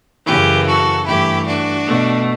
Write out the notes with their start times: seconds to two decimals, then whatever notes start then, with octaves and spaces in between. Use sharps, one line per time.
0.26 F#2 C#3 E3 G4 B4
0.66 F#4 A4
1.06 G2 E3 A3 E4 G4
1.46 D4 F#4
1.86 B2 A3